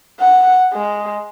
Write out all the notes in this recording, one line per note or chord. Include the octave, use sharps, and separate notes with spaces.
F#5
G#3